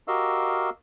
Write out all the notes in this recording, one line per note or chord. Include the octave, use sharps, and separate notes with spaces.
F#4 G4 A#4 D#5 F5 E6